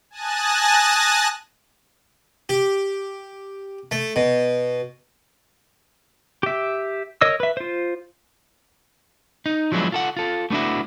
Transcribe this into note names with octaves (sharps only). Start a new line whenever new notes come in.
G#5 A5 D#6 F#6 A6 A#6
G4
A3
B2
G4 E5
A#4 C#5 D#5 E6
B4 E5
F4 C5
D#4
F3 F#3 G#3 B3 D4 E4
F4 A4 F#5
F4 A4
A3 B3 D4 E4 F#4